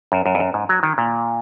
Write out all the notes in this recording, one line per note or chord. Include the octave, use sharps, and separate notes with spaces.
F#2
F#2
F2
F#2
G#2
F#3
D#3
A#2